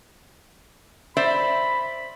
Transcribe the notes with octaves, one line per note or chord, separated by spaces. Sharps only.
C5 D5 E5 B5